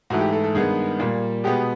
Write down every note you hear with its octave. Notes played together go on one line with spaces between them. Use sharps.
G#2 E3 A3 F#4
G4
A4
A4
G2 D#3 G#3 B3 G#4
A#2 G3 A#3
B2 G#3 B3 G4